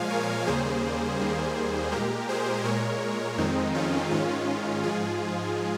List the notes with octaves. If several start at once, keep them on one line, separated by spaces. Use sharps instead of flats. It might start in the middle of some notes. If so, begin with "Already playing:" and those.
Already playing: A#2 F3 G#3 F5 G#5
A#4 C#5
D#2 C#3 G3 A#3 G#4 C5
D#2 D#3 G3 A#3
A#2 G#3 G4 A#4
G#4 C5
A#2 G#3 A#4 C#5
F2 D#3 G#3 C4 D#4
C#4 F4
G#2 D#3 G#3 C#4 F4
G#2 F3 G#3 F4 G#4